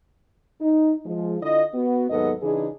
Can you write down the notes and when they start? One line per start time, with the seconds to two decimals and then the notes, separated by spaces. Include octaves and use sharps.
0.61 D#4
1.06 F3 G#3
1.41 D3 E4 F4 D#5
1.75 B3 F#4
2.10 D#2 G#2 F#3 B3 A4 D#5
2.42 C#3 E3 D4 D#4 G#4